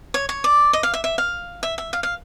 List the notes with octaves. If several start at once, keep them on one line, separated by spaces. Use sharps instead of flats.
C#5
C#5
D5
D#5
F5
E5
E5
F5
E5
E5
F5
F5